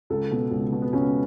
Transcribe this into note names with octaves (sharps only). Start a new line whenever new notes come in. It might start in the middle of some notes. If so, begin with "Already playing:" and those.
C#2 A4
B2
C#2
B2
B3
C#2 C#4